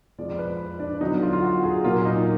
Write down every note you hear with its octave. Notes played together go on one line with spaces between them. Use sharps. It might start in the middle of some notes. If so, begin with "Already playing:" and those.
F2 F3 G#3 D5
D5
B4
D4
D3 F#3 B3 D#4
F4
F4
F#4
G#4
A#2 F#3 A#3 F4
D#4